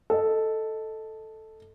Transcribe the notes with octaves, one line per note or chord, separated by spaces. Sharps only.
A4 D#5